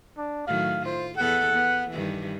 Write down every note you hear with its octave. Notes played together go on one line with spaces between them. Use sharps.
D4
A2 D#3 F#3 F5
F4 C5
E2 B3 A4 F#5
B3
G2 D#3 E3